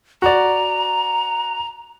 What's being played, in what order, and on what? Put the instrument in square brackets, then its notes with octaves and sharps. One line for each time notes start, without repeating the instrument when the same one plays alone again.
[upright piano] F#4 D5 [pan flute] A#5